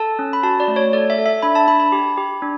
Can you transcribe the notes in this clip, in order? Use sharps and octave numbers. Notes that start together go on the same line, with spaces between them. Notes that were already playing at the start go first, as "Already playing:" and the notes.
Already playing: A4 A5
C#4
B5
F#4 A5
D5
A3
C#5
A4 D5
E5
A4
E5
D4 B5
A5
D4 B5
B5
G4
G4
D4